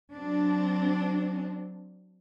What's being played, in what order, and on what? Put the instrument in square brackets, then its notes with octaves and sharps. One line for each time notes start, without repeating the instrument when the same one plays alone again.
[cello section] F#3 C4 D4